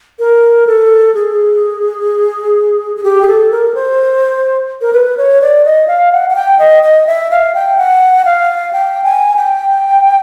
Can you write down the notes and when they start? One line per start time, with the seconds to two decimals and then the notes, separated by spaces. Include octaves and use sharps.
0.19 A#4
0.67 A4
1.14 G#4
2.96 G#4
3.04 G4
3.22 G#4
3.27 A4
3.51 A#4
3.75 C5
4.82 A#4
4.93 B4
5.17 C#5
5.41 D5
5.65 D#5
5.88 F5
6.12 F#5
6.30 F#5
6.35 G5
6.59 D#5
6.83 D#5
7.07 E5
7.31 F5
7.54 G5
7.78 F#5
8.25 F5
8.73 G5
9.04 G#5
9.36 G5